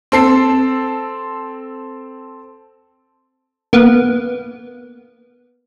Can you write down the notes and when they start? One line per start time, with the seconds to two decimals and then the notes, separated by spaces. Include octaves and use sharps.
0.12 C4 A4 C7
3.73 A#3 B3